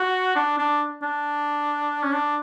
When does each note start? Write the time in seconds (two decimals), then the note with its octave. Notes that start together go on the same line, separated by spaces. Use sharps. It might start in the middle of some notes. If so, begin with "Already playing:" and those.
Already playing: F#4
0.35 D4
0.58 D4
1.02 D4
2.03 C#4
2.12 D4